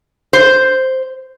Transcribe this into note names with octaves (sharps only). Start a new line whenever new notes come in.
C5